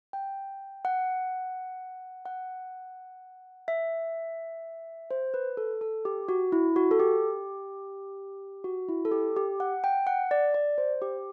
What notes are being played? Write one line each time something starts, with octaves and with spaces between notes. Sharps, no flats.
G5
F#5
F#5
E5
C5
B4
A4
A4
G4
F#4
E4
F#4
A4
G4
F#4
E4
A4
G4
G4
F#5
G5
F#5
D5
D5
C5
G4